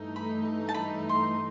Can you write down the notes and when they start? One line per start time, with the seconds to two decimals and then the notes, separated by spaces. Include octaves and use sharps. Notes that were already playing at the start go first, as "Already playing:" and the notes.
Already playing: G2 E3 A3 D#4
0.16 B5
0.69 A5
0.74 B5
1.09 C6